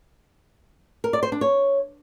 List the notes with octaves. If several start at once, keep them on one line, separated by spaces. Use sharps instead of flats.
A#4
D5
C5
D4
C#5